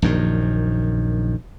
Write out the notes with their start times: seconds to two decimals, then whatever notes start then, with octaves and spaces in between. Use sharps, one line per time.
0.02 A#1 F#2 D#3